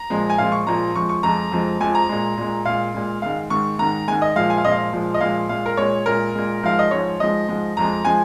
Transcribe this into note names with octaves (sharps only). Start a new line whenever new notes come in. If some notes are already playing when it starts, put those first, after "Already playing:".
Already playing: A#5
A#2 F3 G#3
G#5
A#2 F3 G#3 F5
C#6
A#2 F3 G#3 A#5
F2 F3 G#3 C#6
C#6
F2 F3 G#3 A#5
F2 F3 G#3
F2 F3 G#3 G#5
A#5
A#2 G#3
A#2 G#3
A#2 G#3 F5
A#2 G#3
G#2 D#3 G#3 F5
G#2 D#3 G#3 C#6
G#2 D#3 G#3 A#5
G#2 D#3 G#3 G#5
D#5
A#2 F3 G#3 F5
G#5
F5
A#2 F3 G#3 D#5
F5
A#2 F3 G#3
D#5
A#2 F3 G#3 F5
A#2 G#3 F5
A#4
A#2 G#3 C#5
A#2 G#3 A#4
A#2 G#3
G#2 F3 G#3 F5
D#5
G#2 F3 G#3 C#5
G#2 F3 G#3 D#5
G#2 F3 G#3
F2 F3 G#3 A#5
F3 G#3 G#5